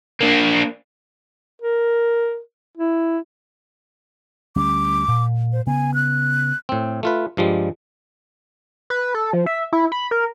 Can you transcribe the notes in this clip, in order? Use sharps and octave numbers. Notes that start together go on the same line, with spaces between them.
A#3 D4
A#4
E4
D2 G3 C#4 D6
A#2
C5
C#3 B3 G#5
F#6
A2 C4
A3 F4 B4
G2 F3 G3 G#3
B4
A4
F3
E5
E4
B5
A#4